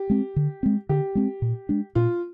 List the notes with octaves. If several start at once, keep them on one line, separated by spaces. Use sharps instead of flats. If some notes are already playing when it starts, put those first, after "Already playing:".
Already playing: G4
G#3 C4
D3
G#3 C4
D3 G4
G#3 C4
A#2
G#3 D4
A#2 F4